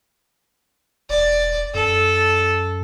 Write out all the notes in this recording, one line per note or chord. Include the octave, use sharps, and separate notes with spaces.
E1 D5
F#2 A4